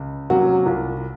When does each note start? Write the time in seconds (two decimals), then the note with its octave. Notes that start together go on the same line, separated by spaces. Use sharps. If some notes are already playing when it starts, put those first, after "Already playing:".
Already playing: C#2
0.30 C3 F#3 A#3 C#4 F#4
0.66 C2 F4